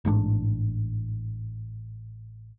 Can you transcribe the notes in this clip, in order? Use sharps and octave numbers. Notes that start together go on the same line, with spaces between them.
A1 G#2 C#4 D4